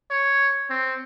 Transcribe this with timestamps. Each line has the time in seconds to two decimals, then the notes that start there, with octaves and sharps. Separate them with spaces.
0.11 C#5
0.70 C4